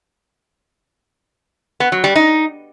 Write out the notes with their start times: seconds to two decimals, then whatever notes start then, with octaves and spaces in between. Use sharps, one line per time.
1.80 B3
1.92 F#3
2.04 G3
2.16 D#4